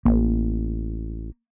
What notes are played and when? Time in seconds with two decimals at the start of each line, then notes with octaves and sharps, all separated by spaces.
0.05 A1 A#3